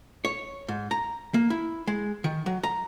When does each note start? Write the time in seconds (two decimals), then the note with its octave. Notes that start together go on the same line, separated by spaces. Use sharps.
0.25 C#5
0.68 G#2
0.91 A#5
1.34 A#3
1.50 E4
1.87 G#3
2.24 D#3
2.46 F#3
2.63 A#5